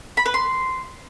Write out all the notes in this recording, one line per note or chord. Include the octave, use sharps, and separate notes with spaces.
B5
B4
C6